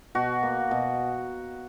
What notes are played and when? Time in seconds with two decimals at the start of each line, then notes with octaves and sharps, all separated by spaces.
0.15 B2 F#4
0.43 A#3
0.71 B2